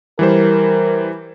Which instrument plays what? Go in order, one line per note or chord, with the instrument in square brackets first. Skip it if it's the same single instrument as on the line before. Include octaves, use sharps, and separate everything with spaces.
[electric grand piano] E3 G3 C5 [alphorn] A#4